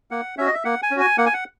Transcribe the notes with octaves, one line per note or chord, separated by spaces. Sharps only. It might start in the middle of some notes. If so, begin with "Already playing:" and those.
A#3 F#5
C#4 F#4 E5
D#5
E5
A#3 F#5
G#5
C#4
F#4 G#5
A#3 F#5
G#5
F#5